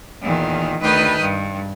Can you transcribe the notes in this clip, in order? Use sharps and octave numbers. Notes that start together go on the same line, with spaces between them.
E2 A#2 D#3
D2 D#3 B4 G5 D#6 F6
G2